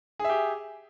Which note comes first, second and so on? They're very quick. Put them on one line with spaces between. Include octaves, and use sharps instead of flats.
G#4 E5 G4